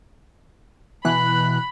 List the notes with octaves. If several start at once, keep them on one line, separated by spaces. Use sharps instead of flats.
B2 E3 B5 F#6